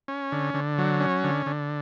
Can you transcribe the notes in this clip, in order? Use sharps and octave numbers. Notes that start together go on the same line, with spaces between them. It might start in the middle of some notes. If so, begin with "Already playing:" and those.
C#4
D3
D3
F#3
C#4
D3
D3